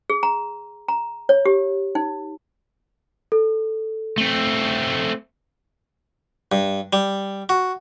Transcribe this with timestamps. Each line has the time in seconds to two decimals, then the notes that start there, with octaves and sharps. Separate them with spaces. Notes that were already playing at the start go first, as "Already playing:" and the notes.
0.10 G#4
0.23 A#5
0.88 A#5
1.29 C#5
1.46 G4
1.95 D#4
3.32 A4
4.18 A3 C4
6.52 G2
6.93 G3
7.49 F#4